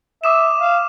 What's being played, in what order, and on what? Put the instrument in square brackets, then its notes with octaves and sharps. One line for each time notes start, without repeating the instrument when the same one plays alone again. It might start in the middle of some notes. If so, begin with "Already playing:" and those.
[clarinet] E5 [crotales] D6 D#6 E7
[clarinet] F5